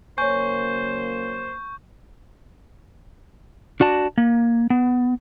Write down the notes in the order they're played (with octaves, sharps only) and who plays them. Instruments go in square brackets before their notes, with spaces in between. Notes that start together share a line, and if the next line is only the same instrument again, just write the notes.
[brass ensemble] C#3 F#3 A#3 [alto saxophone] C5 [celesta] C#5 G#5 [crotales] C#6 G6
[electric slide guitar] D4 F#4 D5 A5
A#3
B3